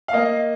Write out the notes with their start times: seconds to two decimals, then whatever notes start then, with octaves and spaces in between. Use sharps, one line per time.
0.08 F5
0.13 A#3 D#5